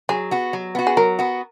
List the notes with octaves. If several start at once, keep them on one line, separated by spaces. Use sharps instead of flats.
F#3 G#4
B3 F#4
F#3
B3 F#4
G#4
F#3 A#4
B3 F#4